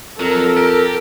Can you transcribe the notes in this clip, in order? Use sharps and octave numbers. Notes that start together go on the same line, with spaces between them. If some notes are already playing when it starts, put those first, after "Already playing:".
F2 F#3 A4 A#4
G4